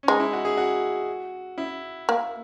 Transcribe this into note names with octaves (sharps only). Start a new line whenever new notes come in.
C#4
G#3 D#4
E4
F#4
G#4
F#4
E4
A#3